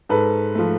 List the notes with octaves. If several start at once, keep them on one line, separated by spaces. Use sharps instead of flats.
G#2 A4 B4
F3 A3